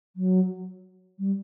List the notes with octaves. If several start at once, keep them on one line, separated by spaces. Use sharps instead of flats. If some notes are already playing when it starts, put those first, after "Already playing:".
F#3
G3